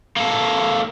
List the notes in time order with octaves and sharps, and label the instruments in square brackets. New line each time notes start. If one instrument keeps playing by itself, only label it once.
[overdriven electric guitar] A#3 A4